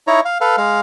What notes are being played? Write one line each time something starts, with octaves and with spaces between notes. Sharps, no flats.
D#4 E4 C#5 A#5
F5
A4 B4 F5
G#3 F5